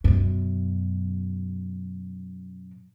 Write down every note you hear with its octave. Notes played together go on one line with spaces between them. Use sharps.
F#2 B2